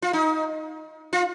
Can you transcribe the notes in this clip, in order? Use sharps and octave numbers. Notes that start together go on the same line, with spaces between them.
F4
D#4
F4